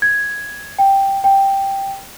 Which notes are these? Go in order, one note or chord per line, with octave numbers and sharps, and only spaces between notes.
G#6
G5
G5